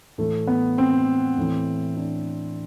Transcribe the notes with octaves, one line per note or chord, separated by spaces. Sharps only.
A2 E3 A3
B3
C4
A2 E3
D4